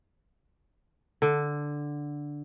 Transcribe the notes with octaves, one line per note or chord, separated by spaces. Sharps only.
D3